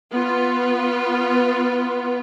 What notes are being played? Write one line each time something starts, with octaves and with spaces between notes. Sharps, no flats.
B3 F4